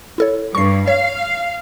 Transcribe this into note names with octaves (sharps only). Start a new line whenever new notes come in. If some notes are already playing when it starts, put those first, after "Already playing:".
E4 A4 C#5
G2 C#6 C7
C#5 F5